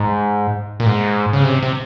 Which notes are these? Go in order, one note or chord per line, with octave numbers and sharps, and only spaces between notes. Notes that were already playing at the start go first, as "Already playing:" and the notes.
Already playing: G#2
A#2
G#2
C#3
C3
C3